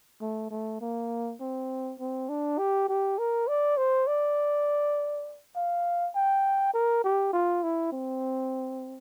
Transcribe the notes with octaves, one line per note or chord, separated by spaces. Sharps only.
A3
A3
A#3
C4
C4
D4
G4
G4
A#4
D5
C5
D5
F5
G5
A#4
G4
F4
E4
C4